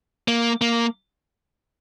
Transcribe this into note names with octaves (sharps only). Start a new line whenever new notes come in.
A#3
A#3